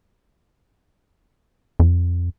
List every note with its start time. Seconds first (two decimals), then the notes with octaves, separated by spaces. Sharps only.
1.80 F2